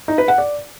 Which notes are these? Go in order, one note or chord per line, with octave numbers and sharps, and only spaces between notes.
D#4
B4
F#5
D5